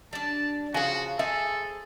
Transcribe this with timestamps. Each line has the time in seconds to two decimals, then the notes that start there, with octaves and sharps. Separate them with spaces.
0.13 G3 D4 A5
0.74 C#3 F3 F#4 G#5
1.19 G#4 A4 C5 E5